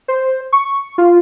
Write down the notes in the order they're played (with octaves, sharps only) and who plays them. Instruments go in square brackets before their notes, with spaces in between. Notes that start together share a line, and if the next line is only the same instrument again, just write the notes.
[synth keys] C5
C#6
F4